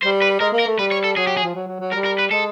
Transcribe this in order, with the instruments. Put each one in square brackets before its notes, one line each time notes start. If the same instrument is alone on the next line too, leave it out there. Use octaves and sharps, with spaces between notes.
[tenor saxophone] G3 [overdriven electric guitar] C5
[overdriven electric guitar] B4
[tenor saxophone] G#3 [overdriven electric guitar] A#4
[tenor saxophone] A#3
[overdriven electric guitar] A#4
[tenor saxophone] A3
[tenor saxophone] G3 [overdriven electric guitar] B4
[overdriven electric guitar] C#5
A4
[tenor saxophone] F#3 [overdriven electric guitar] G#4
[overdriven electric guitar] G4
G#4
[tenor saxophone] F3
F#3
F#3
F#3
[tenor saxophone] G3 [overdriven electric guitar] A#4
[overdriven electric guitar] A#4
B4
[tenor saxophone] G#3 [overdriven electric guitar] A4